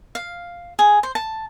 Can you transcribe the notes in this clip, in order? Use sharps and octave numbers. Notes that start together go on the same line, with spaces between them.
F5
G#4
C5
A5